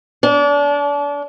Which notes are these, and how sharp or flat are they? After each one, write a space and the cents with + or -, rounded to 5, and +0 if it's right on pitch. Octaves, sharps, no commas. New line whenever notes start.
D4 -35